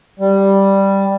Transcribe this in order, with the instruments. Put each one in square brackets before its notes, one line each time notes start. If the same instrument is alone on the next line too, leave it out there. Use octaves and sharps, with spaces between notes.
[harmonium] G3